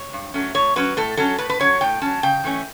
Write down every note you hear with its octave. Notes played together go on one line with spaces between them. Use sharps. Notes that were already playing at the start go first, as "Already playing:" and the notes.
Already playing: C#5
G2
F#3 A3 C#4
A2 C#5
F#3 C#4 B4
A2 A4
F#3 C#4 A4
A2 B4
B4
F#3 C#4 C#5
A2 G5
F#3 C#4 A5
C#3 G5
E3 A3 C#4